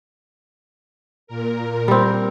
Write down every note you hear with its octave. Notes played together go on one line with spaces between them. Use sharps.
A#2 A#4
G3 C4